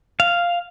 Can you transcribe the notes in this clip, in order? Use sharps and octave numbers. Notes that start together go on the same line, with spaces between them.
F5